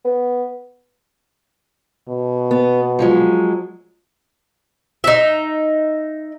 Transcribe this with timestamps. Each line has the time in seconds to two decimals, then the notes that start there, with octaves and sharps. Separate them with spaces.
0.05 B3
2.09 B2
2.51 B3
2.99 F3 F#3 G#3
5.04 D#4 E5